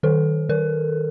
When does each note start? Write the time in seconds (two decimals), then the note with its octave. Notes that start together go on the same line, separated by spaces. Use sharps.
0.03 D#3 A4
0.49 D#3 A#4